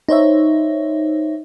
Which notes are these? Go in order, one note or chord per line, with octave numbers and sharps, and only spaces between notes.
D#4 C5 C#5 E5